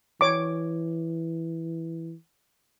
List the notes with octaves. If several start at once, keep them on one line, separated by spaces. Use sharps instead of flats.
E3 C#5 D6